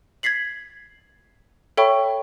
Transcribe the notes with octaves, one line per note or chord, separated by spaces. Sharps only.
G#6 A6 B6 C7 F#7
A4 C#5 E5 G5 B5 C#6